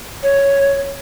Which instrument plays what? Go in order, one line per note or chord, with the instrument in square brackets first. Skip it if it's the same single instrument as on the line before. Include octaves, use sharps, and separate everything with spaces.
[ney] C#5